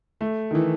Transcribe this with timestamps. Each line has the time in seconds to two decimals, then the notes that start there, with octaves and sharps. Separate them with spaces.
0.21 A3
0.51 D#3
0.55 E3